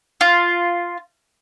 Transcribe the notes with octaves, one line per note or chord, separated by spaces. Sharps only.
F4